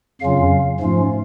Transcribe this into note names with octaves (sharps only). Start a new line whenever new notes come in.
F2 C#3 F#3 C#4 F4 F5
G#2 F3 A3 C#4 F4